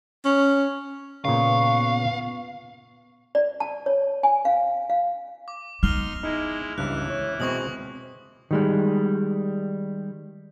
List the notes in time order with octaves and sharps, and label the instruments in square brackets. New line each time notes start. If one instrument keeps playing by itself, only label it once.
[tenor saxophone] C#4
[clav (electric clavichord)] A#2 C#3 [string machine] B3 [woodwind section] B4 C#6 [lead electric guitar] F5
[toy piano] D5
A5
C#5
G#5
F5
F5
[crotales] D6
[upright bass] B3 [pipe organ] D#4 C6 [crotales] F6 F7 G7
[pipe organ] G#3 E4 [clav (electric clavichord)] D#4
[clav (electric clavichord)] C#2 G2 [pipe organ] E3 E4 [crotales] F#6
[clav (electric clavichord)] C#5
[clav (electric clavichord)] B2 G#3 C4 [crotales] C#6 D#6 F#7
[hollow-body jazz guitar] D#3 G3 G#3